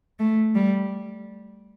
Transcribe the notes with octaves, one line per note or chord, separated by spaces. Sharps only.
A3
G3